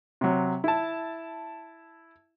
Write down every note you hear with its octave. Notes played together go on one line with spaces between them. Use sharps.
C3 F#3
E4 A5